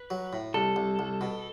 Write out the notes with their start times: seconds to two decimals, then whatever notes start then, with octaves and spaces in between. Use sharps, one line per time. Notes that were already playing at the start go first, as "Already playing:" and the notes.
Already playing: B4
0.10 F#3
0.33 A2
0.54 C2 A4
0.76 C2
0.99 C2
1.21 B2